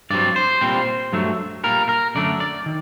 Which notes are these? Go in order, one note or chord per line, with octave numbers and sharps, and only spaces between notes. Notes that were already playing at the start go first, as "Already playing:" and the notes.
G2 F#3 C4 D5
C5
A#2 G3 C4
G2 F#3 A3
A#2 G3 A#3 A#4
A#4
F#2 D3 F#3 A3 D4 D5
D5
D#3